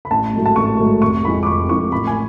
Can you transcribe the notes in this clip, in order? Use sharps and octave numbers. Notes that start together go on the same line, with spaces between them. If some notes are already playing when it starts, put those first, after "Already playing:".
B5
A1 A5
G#2 F#3 A3
A5
A1 C#6
G#2 F#3 A3
F1 C#6
F2 F3 G#3 B5
D6
F1 C#6
F2 F3 G#3 C#6
A1 B5
G#5